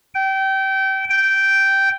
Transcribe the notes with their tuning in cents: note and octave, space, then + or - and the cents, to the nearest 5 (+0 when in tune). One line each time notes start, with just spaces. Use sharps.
G5 -25
G5 -10